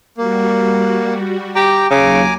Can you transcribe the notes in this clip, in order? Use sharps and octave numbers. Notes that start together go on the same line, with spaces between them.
G3 A#3 F#4
G4 G5 A#5
D#2 C#3 F#3 G#5 A#5 D6